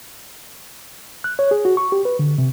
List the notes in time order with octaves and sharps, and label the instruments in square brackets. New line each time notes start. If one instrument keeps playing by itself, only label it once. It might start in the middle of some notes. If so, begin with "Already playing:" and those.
[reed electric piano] F#6
C#5
G#4
F#4
C#6
G4
B4
D3
C3